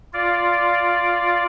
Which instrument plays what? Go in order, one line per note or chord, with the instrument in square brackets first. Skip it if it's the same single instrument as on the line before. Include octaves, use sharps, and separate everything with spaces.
[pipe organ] F4 D5